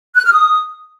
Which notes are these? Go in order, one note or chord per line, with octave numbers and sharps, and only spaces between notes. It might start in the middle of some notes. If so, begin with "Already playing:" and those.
F#6
F6
D#6